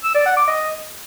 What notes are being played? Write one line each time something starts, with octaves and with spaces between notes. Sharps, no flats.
E6
D5
F#5
D6
D#5